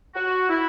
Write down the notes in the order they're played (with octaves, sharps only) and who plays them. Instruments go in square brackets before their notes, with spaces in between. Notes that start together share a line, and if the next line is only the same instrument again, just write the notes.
[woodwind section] F#4
E4